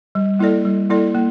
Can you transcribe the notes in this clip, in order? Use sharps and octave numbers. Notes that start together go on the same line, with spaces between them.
G3
A#3 E4 A4 D5
G3
A#3 E4 A4 D5
A#3